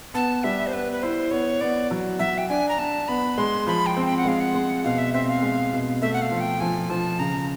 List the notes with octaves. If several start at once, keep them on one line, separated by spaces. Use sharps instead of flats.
B3 A5
G3 E5
C5
B3 B4
B4
E4 C5
B3 C#5
B3 D5
F#3
F#3 E5
G5
D4 G#5
A#5
D4 A5
B3 B5
G#3 C6
F3 B5
G5
C4
G5
F#5
G#3 F5
F#5
G#3
B2 F5
E5
C4 E5
F5
G#3
B2
A3 E5
F#5
F5
F3
G5
F3 G#5
F3 A5
C#3 A#5